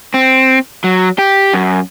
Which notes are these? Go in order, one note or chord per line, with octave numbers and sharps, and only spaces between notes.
C4
F#3
G4
F#2